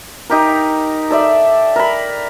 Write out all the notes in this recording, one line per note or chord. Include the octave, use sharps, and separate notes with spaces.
D#4 G4 A#4
A4 D5 E5
A#4 B5